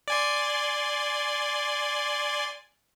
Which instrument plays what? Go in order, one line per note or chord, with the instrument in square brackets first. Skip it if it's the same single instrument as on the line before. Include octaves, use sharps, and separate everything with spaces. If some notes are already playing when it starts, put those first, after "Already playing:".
[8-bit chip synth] D5 G#5 C6